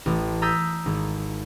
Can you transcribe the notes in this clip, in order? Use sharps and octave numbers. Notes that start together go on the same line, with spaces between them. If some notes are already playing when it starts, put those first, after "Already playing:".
A1 A2
A#5 D#6 E6 G6 A6 B6
G#1